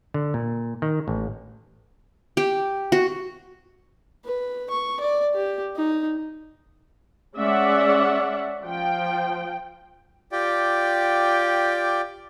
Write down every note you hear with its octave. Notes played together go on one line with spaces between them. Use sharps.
D3
A#2
D#3
A1
G4
F#4
B4
C#6
D5
G4
D#4
G#3 C#4 D5 E5 F#5
F3 G5
F4 G4 D5 G5